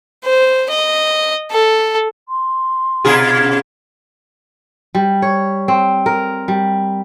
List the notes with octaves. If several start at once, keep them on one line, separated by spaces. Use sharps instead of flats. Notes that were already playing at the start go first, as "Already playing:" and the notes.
C5
D#5
A4
C6
B2 F4 G#4
C#4
G3
C#5
C4
A#4
G3